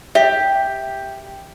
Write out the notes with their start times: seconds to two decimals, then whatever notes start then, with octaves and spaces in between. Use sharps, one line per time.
0.15 G4 E5